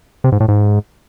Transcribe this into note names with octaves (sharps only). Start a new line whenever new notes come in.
C3
G#2
A2
G#2